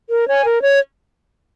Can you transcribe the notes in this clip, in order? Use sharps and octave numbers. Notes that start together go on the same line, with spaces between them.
A#4
C#5 G#5
A#4
C#5